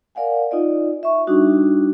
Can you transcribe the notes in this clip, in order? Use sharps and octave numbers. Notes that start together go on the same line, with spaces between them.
A#4 D5 F5 F#5 G#5
D#4 F4 D5 D#5
E5 C#6
G3 D4 D#4 F#4